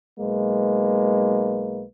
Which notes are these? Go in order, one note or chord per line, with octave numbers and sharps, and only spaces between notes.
B1 G#3 A#3 B4